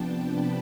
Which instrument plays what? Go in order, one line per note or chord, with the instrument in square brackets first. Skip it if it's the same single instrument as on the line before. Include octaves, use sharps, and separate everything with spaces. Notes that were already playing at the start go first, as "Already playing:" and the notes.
Already playing: [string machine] C3 F3 B3 D4 G5 A5
B5